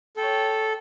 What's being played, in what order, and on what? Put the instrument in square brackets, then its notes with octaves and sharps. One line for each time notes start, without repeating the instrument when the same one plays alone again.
[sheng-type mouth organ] A4 [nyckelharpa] C#5 G5